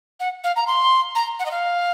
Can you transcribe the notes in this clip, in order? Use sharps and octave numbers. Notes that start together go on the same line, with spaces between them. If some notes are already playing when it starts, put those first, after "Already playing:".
F#5
F5
A#5
C6
A#5
F#5
D#5
F5